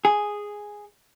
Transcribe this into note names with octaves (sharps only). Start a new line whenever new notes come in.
G#4